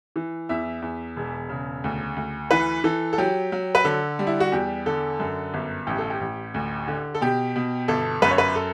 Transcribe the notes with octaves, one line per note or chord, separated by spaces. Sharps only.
E3
E2 E5
E2
E1
C#3
D2
D2
E3 B4
E3 A4
A4
F#3 G4
F#3
B4
D3 A4
G3
E4
F#4
E2 G4
D3 A4
F#2
G1
A1 G4
A4
G4
A1
D2
D3
A4
B2 G4
B2
G1 A4
F#2 B4
C#5
B4
A4